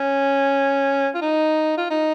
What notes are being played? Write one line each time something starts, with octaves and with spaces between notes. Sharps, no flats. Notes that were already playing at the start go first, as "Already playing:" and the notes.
Already playing: C#4
F4
D#4
F4
D#4